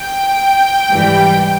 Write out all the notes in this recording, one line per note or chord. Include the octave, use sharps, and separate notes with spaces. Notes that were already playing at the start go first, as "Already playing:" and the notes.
Already playing: G5
G#2 E3 G3